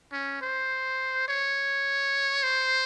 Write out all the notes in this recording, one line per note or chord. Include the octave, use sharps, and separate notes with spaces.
C#4
C5
C#5
C5